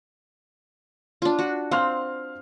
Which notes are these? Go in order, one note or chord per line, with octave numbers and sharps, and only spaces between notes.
D4 F4
F#4
C4 F5 C6 F6